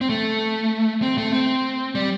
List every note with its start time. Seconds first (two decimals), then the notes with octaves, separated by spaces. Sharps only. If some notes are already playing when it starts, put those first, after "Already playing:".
0.01 C4
0.10 A3
1.02 C4
1.18 A3
1.33 C4
1.95 G3